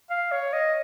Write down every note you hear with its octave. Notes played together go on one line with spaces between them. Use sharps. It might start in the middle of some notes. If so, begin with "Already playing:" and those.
F5
C#5
D#5